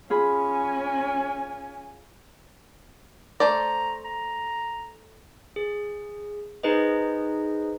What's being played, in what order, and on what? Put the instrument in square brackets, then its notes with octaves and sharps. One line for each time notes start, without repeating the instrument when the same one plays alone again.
[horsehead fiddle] C#4 G#5 [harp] F4 G#4 B5
[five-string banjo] A3 C5 D5 [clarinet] A#5
[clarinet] A#5
[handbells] G#4
D#4 G#4 B4 C5 D#5